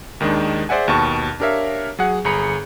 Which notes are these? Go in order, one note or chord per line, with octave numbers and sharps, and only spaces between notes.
D#2 D#3 G#3 D4 D#4
G#4 C5 D5 E5 F#5 G#5
D#2 B2 A5 C#6
D4 G4 A#4 C#5 E5 F5
F#3 G#4 F#5
G1 G#4 A#5 B5 C#7